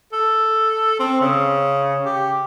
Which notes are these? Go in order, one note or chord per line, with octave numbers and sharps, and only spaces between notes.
A4
C4
C#3
G4